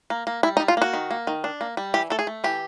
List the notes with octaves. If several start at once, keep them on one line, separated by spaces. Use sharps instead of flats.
A#3
A#3
G3 E4
D#4
G3
F4
A#3 F#4
D#3
A#3
D#3
D4
A#3
G3
E3 G4
A3 A4
G#4
A3
E3 G4